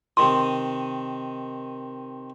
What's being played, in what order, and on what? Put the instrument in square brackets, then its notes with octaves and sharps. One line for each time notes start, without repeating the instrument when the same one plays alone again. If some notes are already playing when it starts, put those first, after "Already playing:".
[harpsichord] C3 D#3 D#6 [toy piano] C6